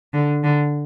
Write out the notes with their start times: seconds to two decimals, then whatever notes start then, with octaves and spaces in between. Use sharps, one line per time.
0.13 D3
0.44 D3